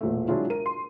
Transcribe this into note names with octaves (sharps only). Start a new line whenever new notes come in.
E1 A#2 A3
F#3 G#3 D4 E4 F4
A#4 D#7
C6